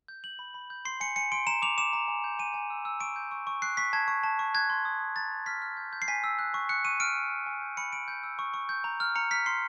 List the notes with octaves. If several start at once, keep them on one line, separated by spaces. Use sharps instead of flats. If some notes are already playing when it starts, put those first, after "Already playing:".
G6
G6 F#7
B5
B5
G6
C6 C7
G#5 C#7
G#5 C#7
C6 D7
A#5 E7
D6 F7
D6 E7
A#5
G#5
G6
G#5 D#7
G#5
E6
E6
C#6 D7
G6
C#6
C#6
F#6 C7
C#6 B6
A5 G#6
C#6
A5
C#6
F#6 G#6
C6
D#6
D#6
A#5 A6
A#5
F6 B6
F6
G6
G6
C7
G#5 B6
E6
F#6
C#6
F#6 C#7
C#6 D#7
F6 D7
G#5
G#5
G#5
G6
B5 C#7
B5 D7
G6
E6
C#6
C#6
G6
A#5
F6
A#5 C#7
F6 B6
C6 C7